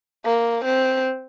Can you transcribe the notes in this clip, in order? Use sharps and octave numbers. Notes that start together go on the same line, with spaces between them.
A#3
C4